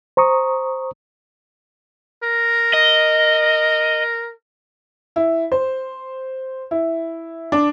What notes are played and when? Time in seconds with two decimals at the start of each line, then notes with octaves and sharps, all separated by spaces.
0.17 C5 A#5 C#6 D#6
2.24 A#4
2.73 D#5
5.16 E4
5.52 C5
6.71 E4
7.52 D4